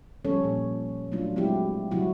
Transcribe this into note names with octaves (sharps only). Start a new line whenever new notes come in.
F3 G3 C#4 A4 C#5
A#2
F#3 A3 D4 F4
F#3 G#3 C4 E4 G4
C3 F#3 G3 E4 F#4